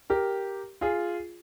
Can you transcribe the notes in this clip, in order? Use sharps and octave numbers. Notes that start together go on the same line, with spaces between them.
G4 A#4
F4 G#4